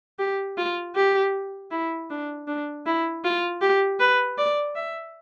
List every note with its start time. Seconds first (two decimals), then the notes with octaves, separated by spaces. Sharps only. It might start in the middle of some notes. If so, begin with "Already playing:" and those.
0.19 G4
0.58 F4
0.95 G4
1.71 E4
2.10 D4
2.48 D4
2.86 E4
3.24 F4
3.62 G4
4.00 B4
4.38 D5
4.75 E5